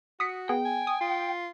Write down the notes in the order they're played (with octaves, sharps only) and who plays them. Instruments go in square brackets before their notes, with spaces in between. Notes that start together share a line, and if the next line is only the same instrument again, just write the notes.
[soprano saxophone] F#4 [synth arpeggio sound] D#6 B6 C#7
[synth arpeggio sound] B3 G#4 [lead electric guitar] G5
[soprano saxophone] G#5
[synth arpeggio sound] D#6
[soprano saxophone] F4